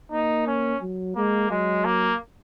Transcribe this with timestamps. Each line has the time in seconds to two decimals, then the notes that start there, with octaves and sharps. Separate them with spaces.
0.12 A#3 D#4
0.47 C#4
0.81 F#3
1.16 G#3 A#3
1.50 F#3 G#3
1.85 A#3